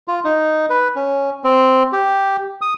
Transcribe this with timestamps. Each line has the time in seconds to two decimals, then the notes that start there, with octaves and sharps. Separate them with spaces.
0.08 F4
0.24 D#4
0.70 B4
0.96 C#4
1.44 C4
1.92 G4
2.61 D#6